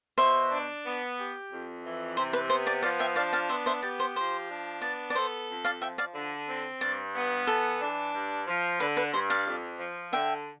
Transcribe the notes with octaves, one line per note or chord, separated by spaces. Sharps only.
B2 C5 E5
D4
B3
G4
F2
E3
C3 C5
B4
B3 C5
D5
F3 D5 F5
E5 G5
D4 D5 F5
D5 F5
B3 C5 E5
C5 E5
G4 D5
C5
F3 C5
D4
B3 D5
D5
A4 C5
F2
D5 F5
F3 E5 G5
D5 F5
D3
C4
G2 D5
B3
E3 A4
D4
G2
F3
D3 B4
B4
G2 C5
D5 F5
F2
F3
D3 E5 G5